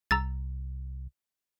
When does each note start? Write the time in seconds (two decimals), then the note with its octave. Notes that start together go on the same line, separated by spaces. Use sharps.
0.11 C2 A#5 E6 A6